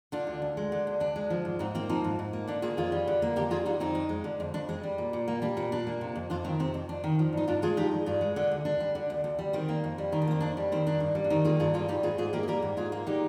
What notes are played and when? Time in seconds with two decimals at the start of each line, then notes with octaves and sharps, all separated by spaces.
0.12 D3 D4 F4
0.27 D2
0.42 D2
0.57 G#3
0.72 D3
0.87 D2
1.00 D2 D4
1.16 G#3
1.30 F3
1.45 G#2
1.59 G#2 C4 D#4
1.75 A#3 C4
1.89 F3 C4 D#4
2.04 G#2
2.19 G#2
2.33 A#3
2.48 D3 D4
2.62 A#3 F4 G#4
2.77 F2 F4 G#4
2.92 G3
3.07 D3
3.22 A#3
3.36 F2 G4 A#4
3.50 G3 F4 G#4
3.65 D3 D#4 G4
3.80 F2 C4 D#4
3.95 F2
4.09 G#3
4.24 D3
4.40 F2
4.54 F2 D4
4.69 G#3 C4
4.83 G3
4.98 A#2
5.13 A#2
5.28 A#3
5.42 G3 D4
5.57 A#2 C4
5.72 A#2 D4
5.87 A#3
6.01 C3
6.15 F2
6.30 F2 D4 F4
6.45 D#3 C4 D#4
6.60 C3 C4
6.74 F2
6.89 F2 D4
7.04 D#3
7.19 F3
7.33 G2 D#4
7.47 G2 D4 F4
7.62 G#3 F4 G#4
7.77 F3 D#4 G4
7.92 G2
8.06 G2 F4 G#4
8.21 G#3
8.36 D3
8.52 D2
8.65 D2 D4
8.80 G3
8.95 D3
9.10 D2
9.24 D2
9.39 G3
9.53 D#3 C4
9.69 A#3
9.84 F2
9.98 G3
10.12 D#3 D#4
10.22 D4
10.27 A#3 C4
10.41 F2 D4
10.57 G3
10.72 D#3 C4
10.86 A#3 D4
11.00 G2
11.15 G3
11.24 D4
11.30 D#3 C4 D#4
11.44 A#3 F4 G#4
11.60 G2 F4 G#4
11.74 G3 F4 G#4
11.89 G3 D#4 G4
12.03 G#2 F4 G#4
12.18 G#2 F4 G#4
12.33 A#3 G4 A#4
12.43 G#4
12.48 G3 G4 A#4
12.62 G#2
12.77 G#2 F4 G#4
12.92 A#3
13.07 D3 D#4 G4